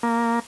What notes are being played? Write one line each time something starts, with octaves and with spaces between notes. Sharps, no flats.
A#3